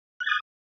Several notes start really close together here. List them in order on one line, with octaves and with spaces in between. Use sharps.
F#6 G#6 A6 D#6